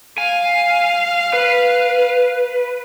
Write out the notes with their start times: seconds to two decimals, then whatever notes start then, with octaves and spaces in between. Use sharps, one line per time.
0.18 F5 G#5
1.33 B4